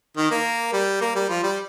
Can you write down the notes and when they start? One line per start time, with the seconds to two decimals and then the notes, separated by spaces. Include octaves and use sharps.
0.17 D#3
0.31 A#3
0.73 G3
1.01 A#3
1.16 G3
1.29 F3
1.44 G3